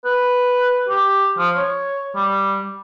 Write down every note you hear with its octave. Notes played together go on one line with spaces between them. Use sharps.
B4
G4
F3
C#5
G3